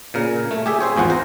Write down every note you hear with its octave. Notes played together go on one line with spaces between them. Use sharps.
A#2 C#3 A#4
A3
G4 G#4 E5
G#4 C5 C#5
G#1 E2 F3 F4 F#5 G#5
C5 A#5